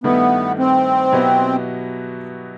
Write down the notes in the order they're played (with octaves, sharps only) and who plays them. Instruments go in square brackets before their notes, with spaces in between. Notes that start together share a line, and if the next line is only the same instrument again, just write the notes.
[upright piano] G2 D#3 A3 E4 B4 [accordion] B3
[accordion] C4
[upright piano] B2 F#3 B3 E4 G4